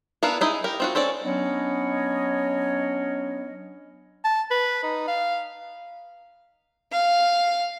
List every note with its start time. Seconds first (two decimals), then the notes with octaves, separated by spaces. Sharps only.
0.23 B3 D4 E4 A#4 F5
0.41 D#4 E4 G#4
0.64 G4 A#4
0.80 C4 F4 F#4
0.95 C4 C#4 A4 D5
1.23 F#3 B3 C#4 D4 C#5 D#5
4.25 A5
4.51 B4
4.83 D#4
5.08 F5
6.92 F5